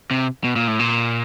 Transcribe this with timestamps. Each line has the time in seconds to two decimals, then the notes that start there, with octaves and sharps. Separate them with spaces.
0.11 C3
0.44 B2
0.56 A#2
0.67 A2
0.79 A#2